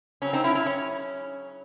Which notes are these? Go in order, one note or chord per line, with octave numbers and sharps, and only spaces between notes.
C#3 F#3 C4 C#4
C4 D#4
C#4 E4
C#4 E4
C#4